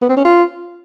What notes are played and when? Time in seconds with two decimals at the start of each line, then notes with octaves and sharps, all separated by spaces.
0.01 B3
0.09 C4
0.17 C#4
0.25 F4